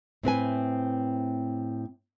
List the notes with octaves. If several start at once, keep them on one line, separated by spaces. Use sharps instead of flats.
A2 C4 B4 G#5